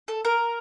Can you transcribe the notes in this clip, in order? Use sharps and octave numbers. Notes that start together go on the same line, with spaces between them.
A4
A#4